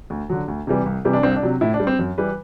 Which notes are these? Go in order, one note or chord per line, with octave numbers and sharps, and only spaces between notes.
D2
D3 F#3
D2
C3 E3 G3
C2
C3 E3 G3
D4
C2 C4
D4
C3 F#3
A2 E4
D4
G3
C4
F#2
E3 G3 B4